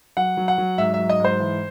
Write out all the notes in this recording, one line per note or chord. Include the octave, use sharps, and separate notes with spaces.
F#3 F#5
F#3
F#5
F#3
G#2 E5
E5
F#3
D#5
G#2 C5
E3